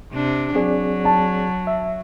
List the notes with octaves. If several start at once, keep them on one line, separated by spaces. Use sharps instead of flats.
C3 D4
F#3 C4 G#4 D5
A5
E5